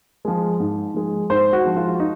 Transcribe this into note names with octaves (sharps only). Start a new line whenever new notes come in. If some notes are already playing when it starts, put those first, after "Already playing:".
F3 G#3
G#2
F3 G#3
G#2 C5
F#4
F3 G#3
F4
D#4